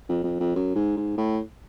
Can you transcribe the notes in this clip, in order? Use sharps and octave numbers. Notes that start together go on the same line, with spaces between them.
F2
F2
F2
F#2
G#2
G#2
A2